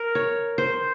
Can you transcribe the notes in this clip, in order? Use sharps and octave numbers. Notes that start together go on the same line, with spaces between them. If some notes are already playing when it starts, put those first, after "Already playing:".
Already playing: A#4
C#5
C5